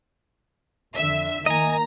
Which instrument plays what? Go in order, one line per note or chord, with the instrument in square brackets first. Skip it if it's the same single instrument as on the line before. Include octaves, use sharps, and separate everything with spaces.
[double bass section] F2 D3 [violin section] E5
[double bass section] D#3 A#3 [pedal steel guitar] D#5 G#5 [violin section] A#5